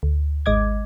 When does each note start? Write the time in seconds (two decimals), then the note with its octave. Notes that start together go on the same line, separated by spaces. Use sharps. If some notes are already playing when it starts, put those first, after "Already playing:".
0.03 D2
0.46 G#1 G#3 D#5 D6 G#6